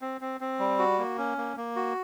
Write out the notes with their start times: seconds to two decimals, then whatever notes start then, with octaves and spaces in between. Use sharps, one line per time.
0.01 C4
0.21 C4
0.41 C4
0.59 G3
0.79 F#4
0.99 A#3
1.18 C#4
1.38 A#3
1.57 A#3
1.76 F#4